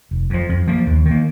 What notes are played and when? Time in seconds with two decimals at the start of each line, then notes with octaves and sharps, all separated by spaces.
0.11 F1
0.30 F2 F3
0.49 F2
0.67 F3 A#3
0.87 D#2
1.06 D#3 A#3